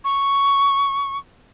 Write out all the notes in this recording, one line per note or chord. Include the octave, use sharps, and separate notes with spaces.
C#6